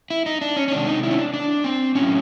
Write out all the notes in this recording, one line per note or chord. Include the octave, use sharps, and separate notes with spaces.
E4
D#4
D4
C#4
C#4
C3 D#3 G#3 D4
D#4
E4
C#4
D4
D4
C4
A2 F#3 A3 C#4